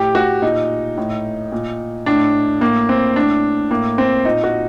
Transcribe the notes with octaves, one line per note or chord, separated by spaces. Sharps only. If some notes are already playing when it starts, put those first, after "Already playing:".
Already playing: A2 G4
F#4
A#2 D#4
A2
A#2
A2 D4
A2 A#3
C4
A2 D4
A2 A#3
C4
A#2 D#4
F#4